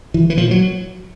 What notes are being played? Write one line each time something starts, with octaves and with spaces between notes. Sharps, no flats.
E3
E3
A#2 F3
F#3